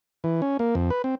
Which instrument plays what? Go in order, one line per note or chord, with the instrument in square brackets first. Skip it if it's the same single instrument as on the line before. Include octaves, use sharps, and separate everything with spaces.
[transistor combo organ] E3
C#4
A#3
F2
B4
C4